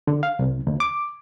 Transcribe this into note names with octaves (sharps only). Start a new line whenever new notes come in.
D3
F5
C2
D2
D6